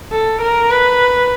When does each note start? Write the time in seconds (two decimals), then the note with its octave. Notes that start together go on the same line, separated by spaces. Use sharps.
0.12 A4
0.41 A#4
0.71 B4